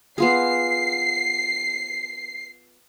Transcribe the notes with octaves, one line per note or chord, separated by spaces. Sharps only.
B3 F4 G#4 C7